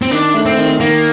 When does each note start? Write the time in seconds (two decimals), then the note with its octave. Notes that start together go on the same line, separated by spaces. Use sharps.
0.02 C4
0.11 D#3 D4
0.34 A3
0.46 C4
0.57 D#3
0.80 D#3 A#3